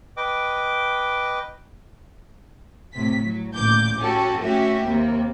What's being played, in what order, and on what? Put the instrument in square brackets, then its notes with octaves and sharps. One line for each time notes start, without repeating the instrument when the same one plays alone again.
[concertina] B4 D#5 G5 D6
[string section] A2 C3 B6
F#3
A1 D2 A#2 D6 G6
C#4 F#4 G4 A4
A3 C#4 F#4 G4 E5
D#2 C3 A#3